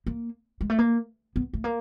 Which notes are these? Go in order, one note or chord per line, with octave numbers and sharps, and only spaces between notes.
A#3
G#3
A3
A#3
B3
A3
A#3